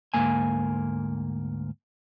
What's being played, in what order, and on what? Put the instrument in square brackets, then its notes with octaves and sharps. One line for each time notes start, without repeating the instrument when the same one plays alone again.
[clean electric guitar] D2 G#2 A#3 G#5